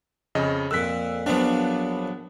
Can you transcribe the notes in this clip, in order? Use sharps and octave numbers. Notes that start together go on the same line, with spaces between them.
F2 C#3 D#5
F2 A#2 E6 F#6 B6
A#1 F3 F#3 B3 D4